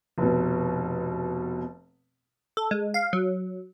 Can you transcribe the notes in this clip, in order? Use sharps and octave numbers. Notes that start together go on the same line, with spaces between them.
F1 B2
A4
G#3
F5
F#3